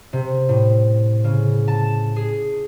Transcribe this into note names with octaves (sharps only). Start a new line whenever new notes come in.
C3
A2
C#3
A5
G#4